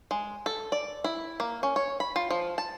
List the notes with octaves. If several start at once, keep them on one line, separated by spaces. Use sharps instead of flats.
G#3
A4
D5
E4
A#3
C#4
C#5
B5
F4
F3
A5